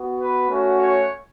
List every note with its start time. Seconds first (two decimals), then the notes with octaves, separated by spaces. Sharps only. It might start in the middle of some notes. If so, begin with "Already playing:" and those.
Already playing: B3 F#4
0.20 B4
0.49 A3 C#4 F#4
0.78 C#5